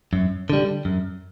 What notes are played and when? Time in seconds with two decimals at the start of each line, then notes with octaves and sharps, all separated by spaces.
0.13 F#2
0.50 D3 G3
0.85 F#2